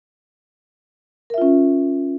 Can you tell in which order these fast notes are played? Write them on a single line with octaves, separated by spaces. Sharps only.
A#4 E5 F4 C#4